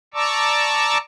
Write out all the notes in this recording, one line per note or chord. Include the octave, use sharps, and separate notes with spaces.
D5 A5 A#5 C#6 D6 E6